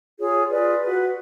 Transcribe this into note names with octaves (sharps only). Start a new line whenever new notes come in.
F4 G#4 C#5
F4 G#4 B4 D5
F#4 B4